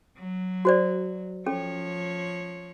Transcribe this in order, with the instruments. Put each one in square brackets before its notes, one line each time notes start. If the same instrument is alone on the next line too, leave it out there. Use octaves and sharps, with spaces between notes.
[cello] F#3
[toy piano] F#4 C5 D5
[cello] F3 C#5 [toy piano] C#4 A4